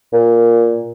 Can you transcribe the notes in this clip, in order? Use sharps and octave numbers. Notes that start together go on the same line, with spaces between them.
A#2